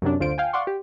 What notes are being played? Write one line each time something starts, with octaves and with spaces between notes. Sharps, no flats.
F#2 C3 F#3 D4
D2 F4 C5 D7
F5 G5 G#5
D5 F5 F#5 C6 C#6
G4